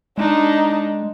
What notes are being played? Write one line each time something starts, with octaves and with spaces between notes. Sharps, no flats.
G#3 D4 D#4